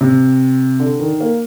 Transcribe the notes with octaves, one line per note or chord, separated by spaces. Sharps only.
C3
D3
D#3
A#3